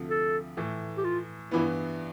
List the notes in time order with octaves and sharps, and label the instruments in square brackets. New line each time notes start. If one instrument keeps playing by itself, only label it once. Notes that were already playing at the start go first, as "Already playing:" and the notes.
Already playing: [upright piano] D2 C3 F3 A3
[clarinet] A4
[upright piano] A2 E3 A3
[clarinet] G4
F4
[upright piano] G2 E3 B3 [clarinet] E4